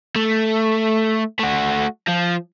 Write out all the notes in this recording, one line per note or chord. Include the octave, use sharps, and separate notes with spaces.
A3
A3 F#4
F3